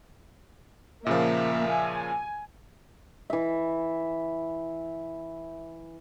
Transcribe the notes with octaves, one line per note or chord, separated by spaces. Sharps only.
A#2 C#3 F3 A#3 E5 F5
G#5
E3 E5